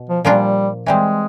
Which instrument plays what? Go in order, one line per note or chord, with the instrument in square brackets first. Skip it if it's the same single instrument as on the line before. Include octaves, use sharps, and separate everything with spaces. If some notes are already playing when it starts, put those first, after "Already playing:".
Already playing: [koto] B2
[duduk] F3
[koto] A#2 F3 A#3 D4 F4 [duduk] G3
[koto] E3 G3 C4 [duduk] G#3